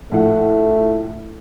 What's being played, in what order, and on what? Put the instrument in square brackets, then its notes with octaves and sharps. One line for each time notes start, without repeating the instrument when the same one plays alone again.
[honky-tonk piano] A#1 A2 F#5 [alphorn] A3